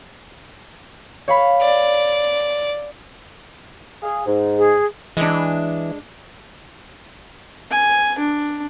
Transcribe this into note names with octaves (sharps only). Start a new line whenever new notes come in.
C#5 F5 B5
D5
G#4 F5
G#2
G#4
E3 G#3 D4
G#5
D4